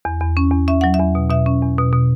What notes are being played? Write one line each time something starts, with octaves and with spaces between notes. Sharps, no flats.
E2
E2
C#4
E2
C#4 E5
F#3 F#5
E5
E2
B2
B2 E5
C#4
E2
B2
B2